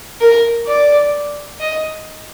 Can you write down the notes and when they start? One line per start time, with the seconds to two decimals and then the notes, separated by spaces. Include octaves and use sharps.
0.20 A#4
0.66 D5
1.60 D#5